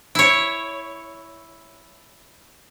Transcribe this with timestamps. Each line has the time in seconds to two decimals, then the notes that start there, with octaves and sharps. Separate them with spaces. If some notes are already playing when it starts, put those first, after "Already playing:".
0.15 E4 C#5